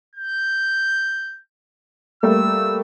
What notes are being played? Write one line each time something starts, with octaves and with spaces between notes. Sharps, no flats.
G6
G3 A3 A#3 E6